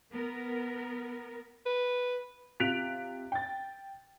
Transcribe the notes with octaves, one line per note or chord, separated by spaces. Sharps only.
B3 A#4
B4
C3 F4 F#6 B6 D7 F7
G5 A6